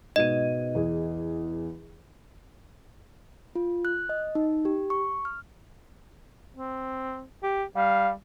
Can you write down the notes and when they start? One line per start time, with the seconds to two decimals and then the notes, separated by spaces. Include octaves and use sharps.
0.16 G#2 B2 D#5 D#7
0.75 E2 G#4
3.55 F4
3.85 F#6
4.09 D#5
4.35 D#4
4.65 G4
4.90 C#6
5.25 F6
6.57 C4
7.43 G4
7.76 G3 F5